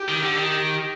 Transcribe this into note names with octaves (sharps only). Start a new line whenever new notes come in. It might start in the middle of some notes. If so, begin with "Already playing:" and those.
Already playing: G4
D#3
D3
D#3